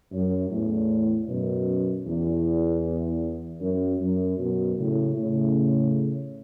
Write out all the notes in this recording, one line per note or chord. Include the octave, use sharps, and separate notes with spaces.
F#2
E2 A2
F#2 B2
E2
F#2
F#2
F#2 B2
A2 C#3
A2 C#3